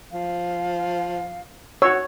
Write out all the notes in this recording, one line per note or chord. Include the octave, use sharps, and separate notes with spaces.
F3 F5
F#4 C#5 E6